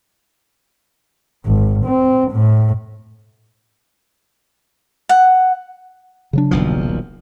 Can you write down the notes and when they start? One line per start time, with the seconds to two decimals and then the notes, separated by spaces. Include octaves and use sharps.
1.46 G#1
1.85 C4
2.32 A2
5.09 F#5
6.33 C#3 F#3 D4
6.51 D#1 B1 F3